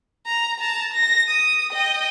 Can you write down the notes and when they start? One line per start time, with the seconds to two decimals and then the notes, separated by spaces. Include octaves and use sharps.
0.26 A#5
0.60 A5 A#5
0.94 A#6
1.28 D#6
1.73 D#5 G5